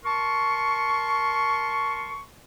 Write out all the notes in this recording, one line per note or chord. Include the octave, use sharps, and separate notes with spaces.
A#4 A5 C6 C#6